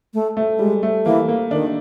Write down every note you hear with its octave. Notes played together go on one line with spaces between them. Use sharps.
A3
A3
G3 G#3
A3
E3 A#3
A#3
D#3 D4